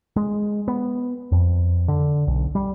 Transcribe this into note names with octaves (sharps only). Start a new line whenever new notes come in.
G#3
B3
F2
D3
B1
G3